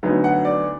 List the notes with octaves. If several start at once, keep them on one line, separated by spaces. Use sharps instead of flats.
D2 D3 F#3 B3 D#4
F#5
D5